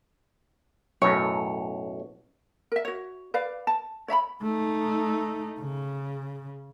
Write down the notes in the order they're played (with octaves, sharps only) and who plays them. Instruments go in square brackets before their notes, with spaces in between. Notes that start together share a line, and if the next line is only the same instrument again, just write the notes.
[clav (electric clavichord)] B1 F#2 A2 [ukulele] C#5
[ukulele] A#4 E5
F#4 C#5
B4 D5 F5
A5
C#5 E5 A#5 B5
[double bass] A3 D#4
C#3